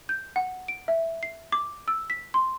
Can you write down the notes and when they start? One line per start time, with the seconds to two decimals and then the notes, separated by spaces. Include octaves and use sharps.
0.09 G6
0.36 F#5
0.68 D7
0.88 E5
1.23 C7
1.52 D6
1.88 E6
2.10 B6
2.34 C6